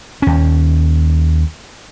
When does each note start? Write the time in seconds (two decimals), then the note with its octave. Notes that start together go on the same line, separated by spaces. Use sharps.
0.22 D#2 C#4